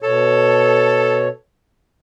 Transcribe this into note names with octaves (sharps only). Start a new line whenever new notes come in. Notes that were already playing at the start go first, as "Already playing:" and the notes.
B2 A4 C#5